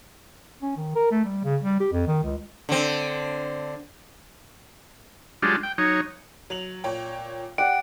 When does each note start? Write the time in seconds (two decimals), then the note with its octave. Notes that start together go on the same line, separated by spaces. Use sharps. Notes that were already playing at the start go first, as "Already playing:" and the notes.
0.62 C#4
0.77 D#3
0.95 A#4
1.11 A3
1.25 G3
1.44 C#3
1.63 G3
1.80 G4
1.92 F2
2.07 D#3
2.24 C#2
2.69 D3 C4
5.42 F#3 G#3 D4 F4 G4
5.63 G5
5.78 F#3 D#4 C#5
6.50 F#3 F7 F#7
6.84 A#2 C#5 G5
7.58 G4 D5 F#5 G5 D7